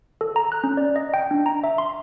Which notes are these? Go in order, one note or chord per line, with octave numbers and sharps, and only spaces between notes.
A4
A#5
F#6
C#4
D5
D#5
G5
D4
A#5
E5
C6